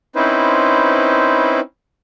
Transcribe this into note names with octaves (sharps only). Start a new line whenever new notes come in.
C4 C#4 D#4 E4 B4 C5